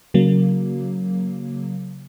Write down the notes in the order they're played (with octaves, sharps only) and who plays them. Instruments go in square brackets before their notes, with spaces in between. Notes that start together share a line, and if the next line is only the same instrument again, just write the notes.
[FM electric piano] C#3 F#3 A#3